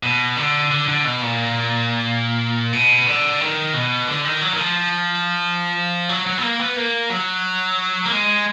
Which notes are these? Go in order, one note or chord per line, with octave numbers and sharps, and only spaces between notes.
B2
D3
D3
D3
B2
A#2
B2
D3
D#3
B2
D3
D#3
F#3
D#3
F3
F#3
F#3
B3
A#3
B3
A#3
F#3
A#3
G#3